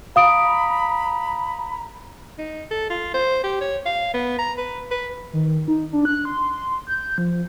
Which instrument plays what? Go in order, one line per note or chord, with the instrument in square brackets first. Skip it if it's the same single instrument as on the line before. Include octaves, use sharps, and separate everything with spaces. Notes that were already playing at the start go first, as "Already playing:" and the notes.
[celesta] F5 D#6 D7 [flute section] A#5 B5
[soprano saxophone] D#4
A4
F4
C5
G4
C#5
F5
B3
A#5
B4
B4
[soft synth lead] D#3
D#4
D4
F#6
C6
G6
F3